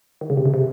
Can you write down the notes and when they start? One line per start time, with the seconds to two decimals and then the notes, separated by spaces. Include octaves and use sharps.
0.21 D#3
0.30 C#3
0.37 C3
0.46 C#3
0.54 C3